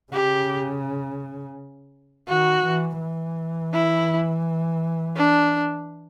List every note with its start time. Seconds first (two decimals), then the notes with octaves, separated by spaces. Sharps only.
0.12 C#3 G4
2.28 D#3 F#4
2.65 E3
3.01 E3
3.73 E4
5.16 D4